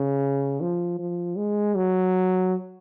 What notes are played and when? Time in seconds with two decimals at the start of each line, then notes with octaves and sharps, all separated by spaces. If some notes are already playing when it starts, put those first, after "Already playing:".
Already playing: C#3
0.61 F3
0.99 F3
1.37 G#3
1.75 F#3